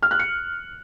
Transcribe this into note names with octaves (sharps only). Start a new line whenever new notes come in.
F6
F#6
C#7